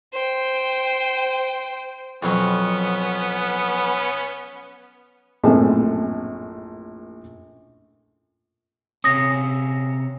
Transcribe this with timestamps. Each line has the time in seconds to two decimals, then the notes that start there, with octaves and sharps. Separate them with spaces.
0.13 C5 G5
2.23 F2 B2 F#3 B3 C#4
5.43 A#1 F#2 A2 C4 G#4 A5
9.04 C3 C#4 D#6 A#6